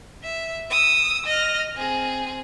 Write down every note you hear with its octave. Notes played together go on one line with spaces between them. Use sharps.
E5
D#6 E6
D#5 F6
C4 G#4